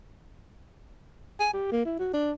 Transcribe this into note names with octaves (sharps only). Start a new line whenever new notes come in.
G#5
G4
A#3
E4
F#4
D4